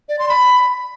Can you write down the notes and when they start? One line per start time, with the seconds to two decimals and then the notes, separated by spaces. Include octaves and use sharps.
0.09 D5
0.19 C6
0.29 B5